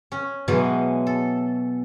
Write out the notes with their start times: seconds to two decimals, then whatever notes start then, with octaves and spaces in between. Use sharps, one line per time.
0.12 C#4
0.48 B2 E3 F#3 G#3
1.07 A4